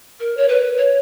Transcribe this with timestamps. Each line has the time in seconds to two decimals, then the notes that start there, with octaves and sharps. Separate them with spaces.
0.20 A#4
0.37 C#5
0.48 B4
0.77 C#5